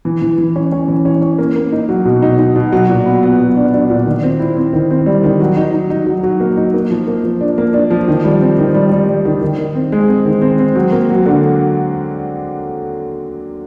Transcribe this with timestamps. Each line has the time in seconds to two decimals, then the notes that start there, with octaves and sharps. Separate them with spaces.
0.05 E3
0.22 E3
0.38 E3
0.56 C#4
0.72 C#4
0.88 E3
1.05 C#4
1.22 C#4
1.38 A#3
1.56 A#3
1.72 D#4
1.89 F#3
2.05 B2
2.22 D#4
2.39 D#4
2.56 B2
2.72 F#3
2.89 A#2
3.06 B3
3.23 B3
3.40 F#3
3.56 D4
3.73 D4
3.90 A#2
4.06 D#3
4.22 C4
4.40 E4
4.57 C4
4.73 D#3
4.91 C4
5.06 G3
5.24 D#3
5.40 F#3
5.57 D#4
5.74 D#4
5.90 D#4
6.07 F#3
6.23 F#3
6.40 A#3
6.57 D#4
6.74 A#3
6.91 F3
7.07 A#3
7.24 F3
7.41 D4
7.58 A#3
7.74 D4
7.90 F3
8.08 D#3
8.25 G3
8.41 C4
8.59 D#3
8.75 G3
8.92 G3
9.08 G3
9.25 D#3
9.42 D#3
9.59 D#3
9.75 C4
9.92 G#3
10.08 C4
10.25 D#3
10.41 C4
10.59 C4
10.75 F#3
10.92 A#3
11.09 F#3
11.26 D3